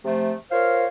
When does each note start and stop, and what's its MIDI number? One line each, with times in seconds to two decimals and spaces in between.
0.05 0.34 48
0.05 0.34 53
0.05 0.34 57
0.51 0.85 65
0.51 0.85 70
0.51 0.85 72
0.51 0.85 73
0.51 0.85 77